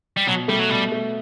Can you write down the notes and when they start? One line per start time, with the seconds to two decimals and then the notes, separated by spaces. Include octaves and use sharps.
0.17 G3
0.27 B2 F#3
0.48 G3 A3
0.59 F#3
0.70 B2 G3
0.92 A3